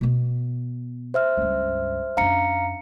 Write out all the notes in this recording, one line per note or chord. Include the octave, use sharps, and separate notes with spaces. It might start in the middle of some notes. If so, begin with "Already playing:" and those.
B2 B3
C5 E5 F6
C#2 G2
F#2 D4 F5 A#5 C#7